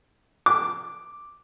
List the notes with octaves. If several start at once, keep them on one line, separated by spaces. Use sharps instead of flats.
D6